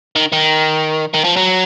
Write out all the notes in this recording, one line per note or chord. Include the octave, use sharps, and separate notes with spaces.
D#3
D#3
D#3
F3
F#3